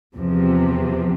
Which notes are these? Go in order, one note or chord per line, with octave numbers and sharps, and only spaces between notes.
E2 C3 F3